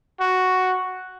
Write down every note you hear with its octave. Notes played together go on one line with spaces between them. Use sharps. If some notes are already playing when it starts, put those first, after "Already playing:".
F#4